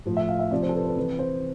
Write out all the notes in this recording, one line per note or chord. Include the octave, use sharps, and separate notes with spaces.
A2 F3
E5
F5
E5
C3 F3 D5
C5
A4
B4
B4
C3 E3 B4
C5